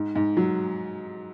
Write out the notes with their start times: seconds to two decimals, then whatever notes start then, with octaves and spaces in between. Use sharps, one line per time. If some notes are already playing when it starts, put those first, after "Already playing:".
Already playing: G#2
0.16 G#2
0.37 F#3